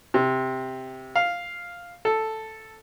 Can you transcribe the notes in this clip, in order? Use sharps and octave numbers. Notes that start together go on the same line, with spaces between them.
C3
F5
A4